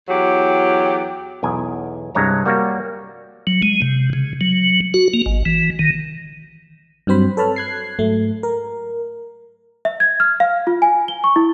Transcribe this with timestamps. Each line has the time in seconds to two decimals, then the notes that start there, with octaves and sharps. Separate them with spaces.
0.09 E2 F#3 G4
1.43 B1 E2 G#5
2.15 C2 G2 G#3 C#5 A#5
2.45 G3 A#3 F#4 C#5
3.47 F#3
3.63 G#3
3.82 C3
4.13 C#3
4.41 F#3
4.94 F#4
5.14 A#3
5.26 G#1
5.46 E3
5.79 D#3
7.07 G2 F#3 C4 C5 B5
7.37 A4 B4 C#5 A5 B5 F6
7.56 F#6 G#6 C7
7.99 G#2 F#3 A3
8.43 A#4
9.85 E5
10.00 G#6
10.20 F6
10.40 F5
10.67 F4
10.82 G#5
11.08 G7
11.24 C#6
11.36 E4